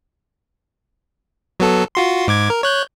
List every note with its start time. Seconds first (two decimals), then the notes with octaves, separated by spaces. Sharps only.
1.60 F#3 B3 A4
1.95 F4 F#4 C6
2.28 G#2 D6 G#6
2.50 A#4
2.63 C#5 F#6 G6